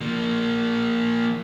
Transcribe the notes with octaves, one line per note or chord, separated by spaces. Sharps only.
F3 A#3